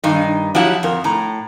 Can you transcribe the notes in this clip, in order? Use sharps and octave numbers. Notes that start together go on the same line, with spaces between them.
G2 D#3 D#4
F3 F#3 E4 G4 F#5 A#5
F2 A#4
A2 A#5